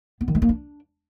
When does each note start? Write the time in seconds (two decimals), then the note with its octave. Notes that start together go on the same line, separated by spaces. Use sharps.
0.21 B3
0.28 D#3
0.35 G#3
0.42 A#3
0.49 D4